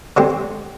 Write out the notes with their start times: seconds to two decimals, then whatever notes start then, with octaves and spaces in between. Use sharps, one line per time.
0.17 D3 G#3 C4 G4 C5